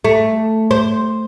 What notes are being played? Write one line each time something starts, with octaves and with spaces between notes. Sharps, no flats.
A3
C5